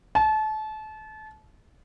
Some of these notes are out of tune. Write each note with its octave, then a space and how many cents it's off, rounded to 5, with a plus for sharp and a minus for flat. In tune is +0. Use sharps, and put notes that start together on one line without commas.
A5 -30